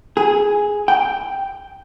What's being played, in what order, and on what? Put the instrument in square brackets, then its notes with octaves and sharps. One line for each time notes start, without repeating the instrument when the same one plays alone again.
[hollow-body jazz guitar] G#4
G5